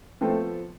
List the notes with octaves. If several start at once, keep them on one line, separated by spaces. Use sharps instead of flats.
F3 A3 B3 C4 F4 A4 C5